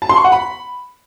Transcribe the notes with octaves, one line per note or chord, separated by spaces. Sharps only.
A5
C6
C#6
F#5
B5